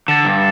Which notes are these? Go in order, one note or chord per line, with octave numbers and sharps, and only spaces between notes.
D3 A6 C#7 E7
G2